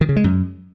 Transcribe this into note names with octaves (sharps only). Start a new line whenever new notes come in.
D#3
C#3
G#3
F#2